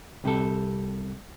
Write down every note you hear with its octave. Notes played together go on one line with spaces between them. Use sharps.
C2 C3 G3 A4